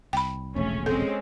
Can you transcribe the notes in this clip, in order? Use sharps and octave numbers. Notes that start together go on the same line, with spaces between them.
C2 G5 B5
E1 A#1 C#3 A3 C#4
G#3 C4 C#4 A4